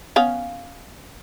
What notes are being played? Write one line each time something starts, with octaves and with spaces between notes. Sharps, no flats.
B3 C#4 F5